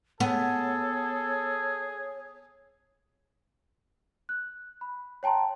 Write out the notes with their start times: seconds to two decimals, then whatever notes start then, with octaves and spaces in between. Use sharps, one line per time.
0.20 B3 G#4 A4 C#5
4.29 F#6
4.81 B5
5.23 C#5 G5 A5 A#5 C6